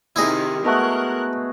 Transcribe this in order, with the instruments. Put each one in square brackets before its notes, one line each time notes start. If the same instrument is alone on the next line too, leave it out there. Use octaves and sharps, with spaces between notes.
[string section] C3 D#3 [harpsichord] E4 G#4 D#5
[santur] G#3 A3 F#4 [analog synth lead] B3 [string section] A#4 F#6